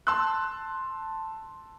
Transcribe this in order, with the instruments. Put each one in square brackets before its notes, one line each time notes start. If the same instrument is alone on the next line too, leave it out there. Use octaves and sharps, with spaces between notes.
[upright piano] A5 C6 E6 F#6